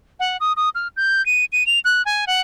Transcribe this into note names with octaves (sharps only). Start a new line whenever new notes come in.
F#5
D#6
D#6
F6
G6
D#7
D#7
F7
F#6
G#5
F#5